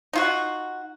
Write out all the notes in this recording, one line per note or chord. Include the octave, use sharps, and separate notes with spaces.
D#4 F4 F#4